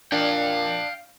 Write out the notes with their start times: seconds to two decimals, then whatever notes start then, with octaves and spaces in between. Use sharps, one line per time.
0.12 A#2 D4 F5 G5